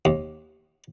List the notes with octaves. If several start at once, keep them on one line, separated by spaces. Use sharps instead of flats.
D#2